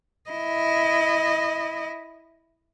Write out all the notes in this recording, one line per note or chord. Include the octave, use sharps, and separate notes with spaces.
E4 D#5